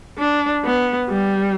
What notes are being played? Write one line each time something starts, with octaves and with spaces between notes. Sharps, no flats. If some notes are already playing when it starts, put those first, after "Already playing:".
D4
B3
G3